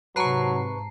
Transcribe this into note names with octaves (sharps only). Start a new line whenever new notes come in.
G#2 C3 F#3 B4 A5 A#5 C#6 C7